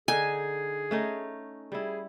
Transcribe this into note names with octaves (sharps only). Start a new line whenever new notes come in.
D3 D#4 G#4 G#5
A3 C#4 D#4
G3 E4 G#4